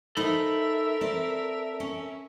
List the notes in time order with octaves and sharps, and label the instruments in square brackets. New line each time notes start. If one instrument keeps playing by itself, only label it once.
[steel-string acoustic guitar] D#4 C5 [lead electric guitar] A4 B5 [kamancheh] A#4 E5
[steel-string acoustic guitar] C4 D5
C#4